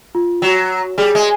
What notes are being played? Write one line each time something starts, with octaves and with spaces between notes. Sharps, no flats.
F4
F#3 F#4
G3 G#4
G#3